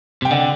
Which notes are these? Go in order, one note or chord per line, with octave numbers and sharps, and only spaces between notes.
C3 G5
D3 D5 F#5